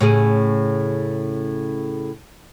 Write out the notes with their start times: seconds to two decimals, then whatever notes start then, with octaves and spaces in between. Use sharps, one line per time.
0.01 A2 C#3 G#4